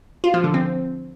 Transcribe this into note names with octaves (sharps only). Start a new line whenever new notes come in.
F4
F3
D3
C4